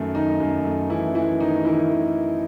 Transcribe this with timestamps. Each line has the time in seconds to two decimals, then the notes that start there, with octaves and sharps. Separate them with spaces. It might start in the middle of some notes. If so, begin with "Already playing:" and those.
Already playing: F#2 D#3 A3
0.15 D#3 D#4
0.40 F#2
0.65 A3
0.90 F#2 E3 E4
1.15 E3 A3 E4
1.40 D#3 D#4
1.65 D#3 E3 E4
1.90 D#3